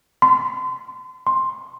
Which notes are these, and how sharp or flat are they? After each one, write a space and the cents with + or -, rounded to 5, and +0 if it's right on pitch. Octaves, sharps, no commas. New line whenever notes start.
C6 -35
C6 +10